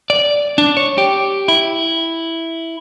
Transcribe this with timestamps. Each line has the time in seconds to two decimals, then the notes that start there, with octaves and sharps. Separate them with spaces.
0.10 D5
0.58 D4
0.77 C#5
0.98 G4
1.48 E4